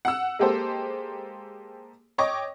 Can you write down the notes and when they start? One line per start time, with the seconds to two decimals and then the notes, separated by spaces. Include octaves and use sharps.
0.05 F#5 E6
0.39 G#3 A#3 G4 A4 C5
2.18 C#5 D#5 G5 C#6 D6 A#6